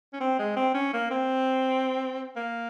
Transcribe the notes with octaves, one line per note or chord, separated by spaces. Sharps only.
C#4
C4
G#3
C4
C#4
A#3
C4
A#3